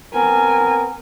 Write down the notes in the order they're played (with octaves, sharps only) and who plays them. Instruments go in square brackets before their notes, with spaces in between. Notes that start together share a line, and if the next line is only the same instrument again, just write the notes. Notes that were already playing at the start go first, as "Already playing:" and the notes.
[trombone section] B3 C4 A#4 [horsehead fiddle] G#5